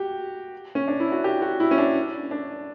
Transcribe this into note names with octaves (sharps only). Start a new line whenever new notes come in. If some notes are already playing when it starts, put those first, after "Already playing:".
Already playing: F#4 G4
C#4
D4
E4
F#4
G4
F#4
E4
C#4
D4
D4